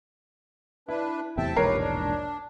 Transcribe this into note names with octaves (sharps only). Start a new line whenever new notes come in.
D4 E4 B4
E2 A2 C3 E5 G5 A5
E1 A#1 G#2 G4 A#4 B4 C#5 C7
D4